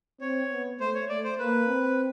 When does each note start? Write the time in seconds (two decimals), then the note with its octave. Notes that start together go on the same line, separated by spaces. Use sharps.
0.21 C4 C#5
0.51 B3
0.79 A3 C5
0.95 C#5
1.09 A3 D5
1.24 C5
1.39 A#3 B4
1.68 C4